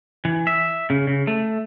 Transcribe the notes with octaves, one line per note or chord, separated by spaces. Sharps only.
E3
E5
C#3
C#3
A3